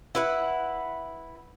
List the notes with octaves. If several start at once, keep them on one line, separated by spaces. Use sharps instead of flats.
E4 B4 F#5